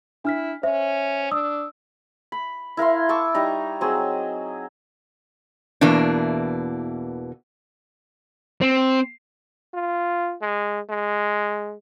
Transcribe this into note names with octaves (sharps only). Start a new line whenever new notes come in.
D4 E4 F6 B6
C#4 C5 E5
D4 D#6 E6
B5
E4 A#4 F5 C6
A5 C#6 D6 E6
G3 D#4 A#5
F#3 C4 G#4
E2 B2 E3 A#3 D4
C4
F4
G#3
G#3